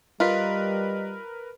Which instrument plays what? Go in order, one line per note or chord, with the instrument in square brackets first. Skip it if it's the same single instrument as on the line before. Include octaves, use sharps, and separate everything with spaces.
[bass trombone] G3 [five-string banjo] F4 [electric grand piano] A#4 B4 [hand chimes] D#5 B6